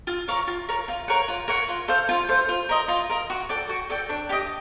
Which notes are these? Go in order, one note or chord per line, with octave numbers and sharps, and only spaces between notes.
F4
A#4 C#5 F5
F4
A#4 C#5 F5
F4
A#4 C#5 F#5
F4
A#4 C#5 F#5
F4
A4 C5 F5
F4
A4 C5 F5
F4
A#4 D#5
F4
A#4 D#5
F#4
A4 D5 G5
F#4
A4 D5 G5
D4
G4 C5 D#5